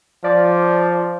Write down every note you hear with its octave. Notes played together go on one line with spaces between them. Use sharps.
F3 D5